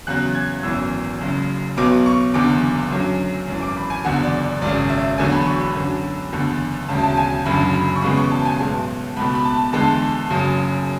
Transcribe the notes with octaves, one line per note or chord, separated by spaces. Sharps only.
E2 C#3 F#3 F#6
G#6
G#1 F#2 E3 B3 E6
F#1 F#2 C#3
B1 B2 F#3 B3 D6
C#6
F#1 E2 D3 D6
F#2 D3 F#3 A3
G#1 F#2 E3
D6
B5
G#5
F#1 E2 D3 F#5
D5
D5
G#1 F#2 C#3 D5
E5
E1 E2 D3 F#3 A3 G#5
B5
C#6
B5
F#2 D3 F#3
F#1 E2 D3 A3
E1 D2 C#3 A5
A5
G#5
F#1 F#2 D3 B5
B5
C#6
E1 E2 C#3 G#3 B3 B5
C#6
A5
G#5
B1 A2 G#3 B3 A5
C#2 B2 A3 B5
B5
A5
E2 D3 G#3 A5
F#1 F#2 C#3